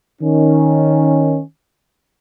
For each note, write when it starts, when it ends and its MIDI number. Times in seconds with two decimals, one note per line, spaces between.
0.22 1.42 51
0.22 1.42 61